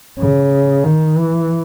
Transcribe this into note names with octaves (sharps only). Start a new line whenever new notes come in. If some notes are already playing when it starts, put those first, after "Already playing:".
C#3
D#3
E3